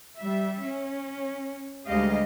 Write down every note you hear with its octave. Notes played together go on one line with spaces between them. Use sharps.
G3 E5
C#4
D2 G3 G#3 G4 D#5 F5